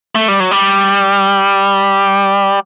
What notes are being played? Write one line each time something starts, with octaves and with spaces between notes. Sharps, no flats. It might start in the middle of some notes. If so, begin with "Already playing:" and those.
A3
G3
F#3
G3